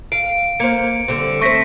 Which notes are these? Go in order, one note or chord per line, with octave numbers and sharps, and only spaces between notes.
F5 D7
A#3 C5 C#7
D3 G3 C4
A3 C4 C5 C#6 A#6 B6